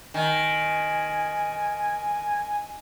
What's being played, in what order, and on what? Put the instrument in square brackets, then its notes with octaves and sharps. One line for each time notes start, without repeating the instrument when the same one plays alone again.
[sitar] D#3 [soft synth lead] G#5